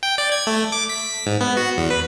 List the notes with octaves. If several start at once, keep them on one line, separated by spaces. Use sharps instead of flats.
G5
D5
G#6
A3
D6
B6
G#2
B3
F#4
E2
B4